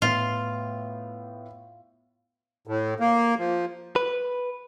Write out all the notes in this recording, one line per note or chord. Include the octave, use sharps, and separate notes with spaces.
A2 B3 F4
A2
A#3
F3
B4